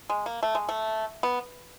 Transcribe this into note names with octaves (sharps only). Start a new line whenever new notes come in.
G#3
A#3
A3
G#3
A3
B3